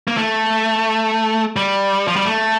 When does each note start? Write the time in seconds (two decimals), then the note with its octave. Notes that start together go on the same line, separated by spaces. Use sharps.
0.08 A#3
0.17 A3
1.56 G3
2.08 F3
2.16 G3
2.25 A3